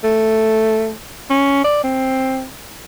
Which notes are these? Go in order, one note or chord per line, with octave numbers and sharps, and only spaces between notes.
A3
C#4
D5
C4